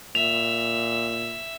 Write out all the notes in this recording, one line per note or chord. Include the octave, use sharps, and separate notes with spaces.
A#2 E5 F7